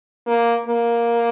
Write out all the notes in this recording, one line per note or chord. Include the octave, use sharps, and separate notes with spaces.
A#3
A#3